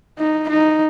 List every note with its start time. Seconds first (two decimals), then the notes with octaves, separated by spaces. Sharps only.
0.18 D#4
0.49 D#4